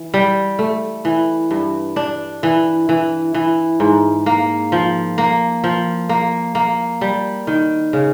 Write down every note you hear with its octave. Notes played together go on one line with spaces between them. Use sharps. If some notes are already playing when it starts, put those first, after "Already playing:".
Already playing: E3
G3
A3
E3
G2
D4
E3
E3
E3
G#2
A#3
F3
A#3
F3
A#3
A#3
G3
D#3
C#3